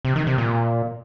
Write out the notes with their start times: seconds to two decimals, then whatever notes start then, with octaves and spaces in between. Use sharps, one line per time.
0.05 C3
0.16 D#3
0.27 C3
0.38 A#2